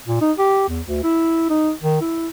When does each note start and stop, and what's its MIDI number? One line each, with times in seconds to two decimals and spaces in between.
0.07 0.20 46
0.21 0.32 63
0.38 0.67 67
0.68 0.81 40
0.86 1.03 38
1.03 1.45 64
1.50 1.71 63
1.83 2.01 51
2.01 2.28 64